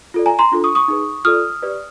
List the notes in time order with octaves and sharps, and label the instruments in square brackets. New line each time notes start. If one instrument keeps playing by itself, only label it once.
[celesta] F4 A4 D5
G#5 A#5
A#5 C6
D4 F4 A4
C#6 D#6
C#6 D#6
D#4 G#4 B4
F4 A4 D5 D#6 F6
G4 B4 D5